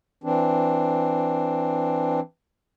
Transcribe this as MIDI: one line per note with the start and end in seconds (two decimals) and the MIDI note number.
0.24 2.20 52
0.24 2.20 60
0.24 2.20 62